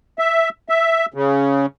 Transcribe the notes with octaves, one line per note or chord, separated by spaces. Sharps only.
E5
E5
C#3